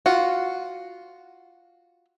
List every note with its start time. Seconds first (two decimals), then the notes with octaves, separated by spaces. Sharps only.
0.06 F4 F#4